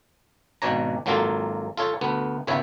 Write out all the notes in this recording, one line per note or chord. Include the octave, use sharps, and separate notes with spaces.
G#1 B2 D4 C#5 A#5
G#1 F#3 A#3 F4 A4
F4 A4 C#5
D2 B3
G#1 C#2 B3 C#5 E5